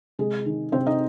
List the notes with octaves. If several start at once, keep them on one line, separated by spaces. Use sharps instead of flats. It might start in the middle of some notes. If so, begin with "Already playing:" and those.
C3 G#3 G#4
D#3
C3 C4 C5
D#4 D#5